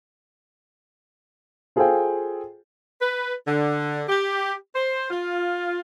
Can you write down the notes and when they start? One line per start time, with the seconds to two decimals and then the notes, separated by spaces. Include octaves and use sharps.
1.76 F4 G#4 A4 C5 F5 G5
3.02 B4
3.48 D3
4.09 G4
4.75 C5
5.11 F4